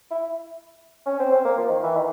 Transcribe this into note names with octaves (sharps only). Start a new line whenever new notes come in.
E4
C#4
C4
C4
A#3
F3
D#3
E3
D#3